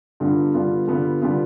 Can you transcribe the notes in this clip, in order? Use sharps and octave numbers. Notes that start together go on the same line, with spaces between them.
G2 D3 G3 B3 F4
G2 D3 G3 B3 F4
G2 D3 G3 B3 F4
D3 G3 B3 F4